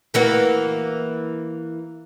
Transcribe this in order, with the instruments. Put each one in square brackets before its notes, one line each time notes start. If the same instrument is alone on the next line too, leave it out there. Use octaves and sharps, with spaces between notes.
[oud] E3 A#3 F#4